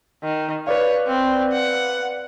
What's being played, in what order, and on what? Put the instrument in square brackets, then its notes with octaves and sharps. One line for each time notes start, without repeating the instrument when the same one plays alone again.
[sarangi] D#3
[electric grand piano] B4 D5 F5 [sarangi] C#5
[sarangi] C4
F#5